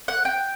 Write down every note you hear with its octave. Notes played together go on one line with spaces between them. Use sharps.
F#5
G5